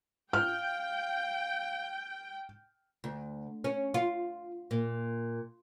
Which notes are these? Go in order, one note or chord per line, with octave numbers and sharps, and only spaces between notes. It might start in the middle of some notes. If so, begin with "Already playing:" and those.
F5 G5 F6
D2
C#4
F4
A#2